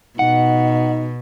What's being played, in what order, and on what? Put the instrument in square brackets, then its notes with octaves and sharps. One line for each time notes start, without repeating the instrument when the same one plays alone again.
[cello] B2 [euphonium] D#4 [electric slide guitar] F#5